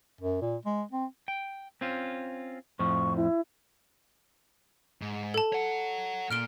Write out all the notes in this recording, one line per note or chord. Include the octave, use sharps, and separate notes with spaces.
F#2
A#2
G#3
C4
G5
C4 C#4 F4
F2 A2 F3 C#6
E4
G#2
A4 A5
C#5 F#5
A#2 F6 D7 G7